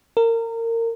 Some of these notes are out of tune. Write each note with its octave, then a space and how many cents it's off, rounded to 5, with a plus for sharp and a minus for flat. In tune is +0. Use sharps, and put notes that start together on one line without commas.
A#4 -25